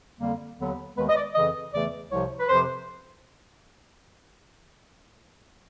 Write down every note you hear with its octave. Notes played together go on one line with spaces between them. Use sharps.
F2 D3 G3 A#3
D#2 D3 F#3 B3
D#2 D#3 G#3 B3 B4
D#5
D5
F2 C#3 E3 D#5
E2 C#3 E3 A3 D5
C2 C3 F3 C#5
B4
F2 C3 F3 C5